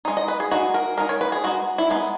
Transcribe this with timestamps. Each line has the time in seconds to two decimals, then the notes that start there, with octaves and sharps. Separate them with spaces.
0.05 G#3 D#4
0.17 D#5
0.28 B4
0.40 G#4
0.51 G#3 D#4 F#4
0.74 A#4
0.97 G#3 D#4 A#4
1.09 C#5
1.21 B4
1.32 G#4
1.43 G#3 D#4 F#4
1.78 E4
1.90 G#3 B3 D#4